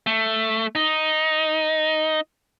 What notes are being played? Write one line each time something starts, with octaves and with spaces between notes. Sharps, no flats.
A3
D#4